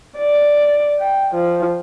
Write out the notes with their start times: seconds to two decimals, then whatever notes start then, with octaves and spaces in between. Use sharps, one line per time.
0.17 D5
0.99 G5
1.35 F3